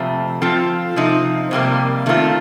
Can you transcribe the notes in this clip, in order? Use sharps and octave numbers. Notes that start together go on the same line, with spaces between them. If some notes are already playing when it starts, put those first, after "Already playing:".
Already playing: F2 C3 F3 A3
F3 C4 F4 A4
C3 F3 C4 D#4
F2 C3 G3 A#3
D#3 A3 C4 F4